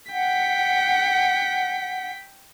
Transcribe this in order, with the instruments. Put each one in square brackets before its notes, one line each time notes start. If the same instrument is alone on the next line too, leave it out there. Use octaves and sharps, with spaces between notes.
[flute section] F#5 [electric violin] G5 B6